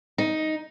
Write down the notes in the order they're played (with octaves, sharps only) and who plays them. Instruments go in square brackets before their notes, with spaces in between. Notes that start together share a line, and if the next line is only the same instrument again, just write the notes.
[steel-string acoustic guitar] D#4